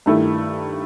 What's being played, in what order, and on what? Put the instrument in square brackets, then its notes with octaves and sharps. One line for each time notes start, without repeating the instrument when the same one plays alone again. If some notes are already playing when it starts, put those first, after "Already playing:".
[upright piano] G2 D#3 A3 E4